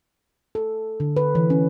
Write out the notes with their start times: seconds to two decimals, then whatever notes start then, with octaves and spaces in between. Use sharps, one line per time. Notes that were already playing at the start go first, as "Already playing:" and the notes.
0.55 A4
1.00 D3
1.16 B4
1.35 E3
1.50 C#4